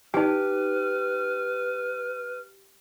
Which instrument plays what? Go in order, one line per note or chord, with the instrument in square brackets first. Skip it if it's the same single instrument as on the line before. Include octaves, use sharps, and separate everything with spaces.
[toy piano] D#4 G#5 [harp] G4 [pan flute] B4 [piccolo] F6